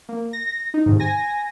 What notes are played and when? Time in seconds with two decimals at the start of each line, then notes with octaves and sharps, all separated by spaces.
0.09 A#3
0.33 A#6
0.74 D#4
0.86 G#2 C3 D#3
1.00 G#5 A#6